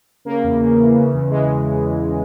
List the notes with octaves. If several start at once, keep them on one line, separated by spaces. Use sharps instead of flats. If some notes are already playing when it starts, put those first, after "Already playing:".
C#3 A#3
E2
C#3
E3
C#3
E2
E3 G#3